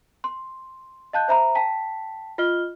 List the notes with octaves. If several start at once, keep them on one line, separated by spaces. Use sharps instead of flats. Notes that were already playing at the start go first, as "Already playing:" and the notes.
C6
D#5 F5 A5 F#6 G6
C5 E5 A#5 B5
G5 A5 B6
F4 D#5 F6 G7